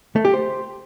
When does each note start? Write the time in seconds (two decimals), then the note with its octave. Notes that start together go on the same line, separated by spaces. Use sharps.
0.16 A3
0.25 G4
0.34 C5